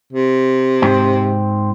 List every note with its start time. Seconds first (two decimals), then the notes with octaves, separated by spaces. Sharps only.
0.13 C3
0.82 G#2 C4